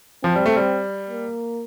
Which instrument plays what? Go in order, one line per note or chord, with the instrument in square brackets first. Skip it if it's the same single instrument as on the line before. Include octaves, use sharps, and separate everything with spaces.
[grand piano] F3 [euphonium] C4
[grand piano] G3
A3
G3
[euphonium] A#3